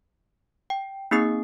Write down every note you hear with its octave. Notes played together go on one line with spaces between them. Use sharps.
G5
A#3 C4 D#4 G#4 D#6 C7